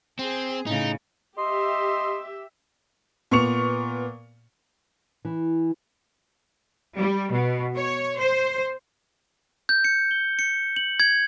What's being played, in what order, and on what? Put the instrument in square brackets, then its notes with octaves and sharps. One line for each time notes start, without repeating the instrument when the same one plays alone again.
[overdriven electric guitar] C4 [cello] G#4
[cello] A2 C#3 [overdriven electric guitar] D#4
[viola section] G4 E5 [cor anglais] D#5 [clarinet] C6
[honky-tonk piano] A#2 B3 C#6 C#7 F7
[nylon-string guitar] E3
[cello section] G3
B2
C#5
C5
[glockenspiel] G6
C#7
G7
C#7
F#7
G#6